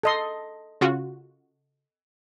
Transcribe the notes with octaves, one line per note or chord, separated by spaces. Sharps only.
A4 D#5 C6
C#3 F4 F#4